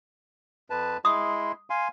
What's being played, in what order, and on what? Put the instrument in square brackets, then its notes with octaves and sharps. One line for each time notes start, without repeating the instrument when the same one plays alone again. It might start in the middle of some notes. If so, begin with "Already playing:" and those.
[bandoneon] F2 B4 A5
[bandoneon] G#3 E4 C6 [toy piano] D#6
[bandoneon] F5 G#5 C6